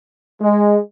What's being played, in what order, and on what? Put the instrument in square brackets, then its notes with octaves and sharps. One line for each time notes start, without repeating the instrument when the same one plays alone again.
[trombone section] G#3